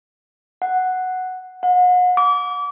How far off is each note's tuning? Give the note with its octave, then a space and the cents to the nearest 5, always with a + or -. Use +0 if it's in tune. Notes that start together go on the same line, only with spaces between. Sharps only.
F#5 +0
F#5 -35
D6 -30